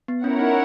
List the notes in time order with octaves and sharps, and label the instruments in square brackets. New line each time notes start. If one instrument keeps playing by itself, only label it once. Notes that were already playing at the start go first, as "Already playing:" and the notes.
[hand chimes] B3
[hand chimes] C#4 [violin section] E4 A#4 C#5 F#5
[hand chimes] D#4